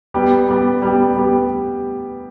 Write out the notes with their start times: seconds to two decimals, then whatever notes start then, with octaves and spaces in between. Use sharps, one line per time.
0.14 G3 B3 G4
0.48 G3 B3 G4
0.82 G3 B3 G4
1.16 G3 B3 G4